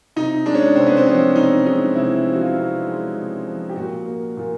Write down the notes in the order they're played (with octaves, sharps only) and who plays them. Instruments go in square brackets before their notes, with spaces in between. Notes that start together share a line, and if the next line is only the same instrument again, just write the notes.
[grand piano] C3 D#4
G#3 D4
C#4
D4
C3 C4
B3
C4
F3 C#4
C3 D#4
G#3 D#4
C3 E4
F3
F#4
F4
C3
G#3
C3
F3
G4
A#2 F#4
A#3
A#2